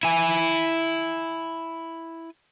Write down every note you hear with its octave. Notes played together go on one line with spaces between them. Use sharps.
E4 G#5